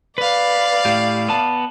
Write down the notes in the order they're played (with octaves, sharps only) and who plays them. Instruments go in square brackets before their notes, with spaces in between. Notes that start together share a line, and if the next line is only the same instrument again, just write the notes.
[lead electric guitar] B4 [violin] D5 F5
[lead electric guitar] A2 G4
B3 A5